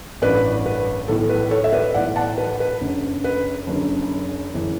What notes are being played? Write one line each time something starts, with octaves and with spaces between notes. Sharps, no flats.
A1 G2 E3 B4 D5
B4
B1 A2 E3 A4
B4
A4 C#5
E5
B4 D5
B1 A2 E3 D5 F#5
F#5 A5
B4
B4
F#1 F#2 D3
B4
F#1 F#2 D3
F#1 E3